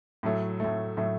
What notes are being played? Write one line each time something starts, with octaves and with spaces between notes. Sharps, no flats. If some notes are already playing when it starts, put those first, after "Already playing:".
A2 F#3 A3
A2 F#3 A3
A2 F#3 A3